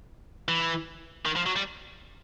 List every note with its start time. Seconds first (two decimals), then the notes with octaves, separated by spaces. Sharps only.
0.48 E3
1.26 D#3
1.36 F3
1.46 F#3
1.56 G3